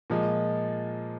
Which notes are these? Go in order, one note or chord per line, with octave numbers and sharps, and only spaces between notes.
A#2 F3 G#3